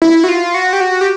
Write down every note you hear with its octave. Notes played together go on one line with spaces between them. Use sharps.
E4
F#4
F4
F#4
G4
F#4
G4